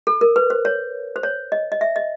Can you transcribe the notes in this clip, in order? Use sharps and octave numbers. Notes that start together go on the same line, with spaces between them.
A4
A#4
B4
C5
C#5
C5
C#5
D#5
D#5
E5
D#5